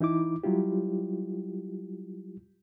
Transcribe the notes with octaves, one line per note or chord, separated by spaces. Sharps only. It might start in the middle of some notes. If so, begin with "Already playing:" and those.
E3 D#4 E4 D6
F#3 G3 E4 F4 G4